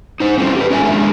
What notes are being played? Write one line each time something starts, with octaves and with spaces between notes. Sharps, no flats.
D#4 C5
G3 C4 C#4 E4 F4 A4
G4 B4
C#4 F4 E5 F#5 G#5
G#3 D4 G#4 A#4